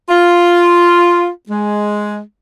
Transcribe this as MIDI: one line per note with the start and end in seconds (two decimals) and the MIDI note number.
0.09 1.28 65
1.49 2.20 56